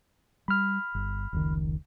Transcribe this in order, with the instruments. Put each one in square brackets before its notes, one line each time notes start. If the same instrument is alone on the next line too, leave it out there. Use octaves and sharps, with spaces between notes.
[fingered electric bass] G3 [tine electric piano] B5 F6
[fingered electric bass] G1
F1 C#2 D#3